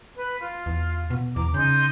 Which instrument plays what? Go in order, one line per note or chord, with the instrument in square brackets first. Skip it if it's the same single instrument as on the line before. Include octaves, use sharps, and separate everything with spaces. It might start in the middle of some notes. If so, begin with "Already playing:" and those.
[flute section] B4
F4
[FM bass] E2
B2
[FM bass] E2 [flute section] A#5 D6
[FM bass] C#3 [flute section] D#4 C6 G6